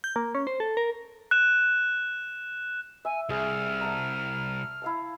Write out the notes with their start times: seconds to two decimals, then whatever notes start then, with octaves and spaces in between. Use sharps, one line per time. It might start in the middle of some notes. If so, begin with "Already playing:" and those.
0.04 G6
0.16 A#3
0.35 C#4
0.47 C5
0.60 A4
0.77 A#4
1.31 F#6 E7
3.05 E5 G#5
3.29 C2 G#4 E5 F6
3.81 F#5 A5 A#5
4.82 E4 F5 A5